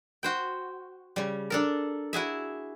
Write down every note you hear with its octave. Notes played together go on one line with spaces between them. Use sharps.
F#4 C5 G5
C#3 G3
D4 A4 A#4
E4 F#4 G#4 E5